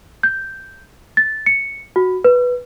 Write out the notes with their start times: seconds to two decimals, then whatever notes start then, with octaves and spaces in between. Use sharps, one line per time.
0.23 G6
1.17 A6
1.46 C#7
1.96 F#4
2.24 B4